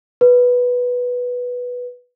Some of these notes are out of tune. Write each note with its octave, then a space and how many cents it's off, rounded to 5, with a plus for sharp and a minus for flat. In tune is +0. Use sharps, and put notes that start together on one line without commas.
B4 -5